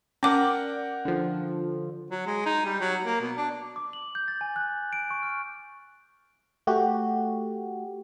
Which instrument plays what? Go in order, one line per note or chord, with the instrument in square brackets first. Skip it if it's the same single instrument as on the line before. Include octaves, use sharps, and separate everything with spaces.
[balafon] C#4 D6 [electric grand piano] A#4 F#5 G5 [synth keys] D5
[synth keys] D3 F3
[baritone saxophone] F#3
G#3
D#4
G3
F#3
A#3
B2
D4
[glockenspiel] D6
F#7
G6
A6
G#5
F#6
D7
C#6
F6
[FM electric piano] A3 F#4 G4